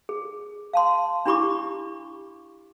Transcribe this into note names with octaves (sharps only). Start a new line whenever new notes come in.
G#4
F5 A5 C6
D4 E4 G4 B5 C#6 D6